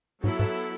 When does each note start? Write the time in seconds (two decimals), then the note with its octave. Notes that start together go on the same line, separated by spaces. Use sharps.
0.23 G#2 F#3 B3 E4 A4
0.39 G#2